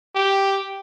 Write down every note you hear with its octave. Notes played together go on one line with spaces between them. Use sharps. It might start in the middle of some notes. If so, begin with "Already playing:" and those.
G4